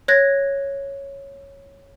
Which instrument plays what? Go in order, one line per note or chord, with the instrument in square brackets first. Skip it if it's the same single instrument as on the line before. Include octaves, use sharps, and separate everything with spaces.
[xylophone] C#5 F#6 G#6 A#6